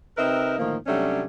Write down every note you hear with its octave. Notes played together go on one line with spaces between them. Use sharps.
C3 C4 D#4 A#4 B4 E5
A2 D3 D#3 F3 A#3
C3 F#3 G3 A3 C#4 D4